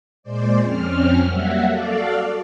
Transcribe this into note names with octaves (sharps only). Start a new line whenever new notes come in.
A#2 G#3 C5 D5
F2 C4 C#4 F6
F#3 G3 A#3 E5 F#5
F#4 A4 D5 F5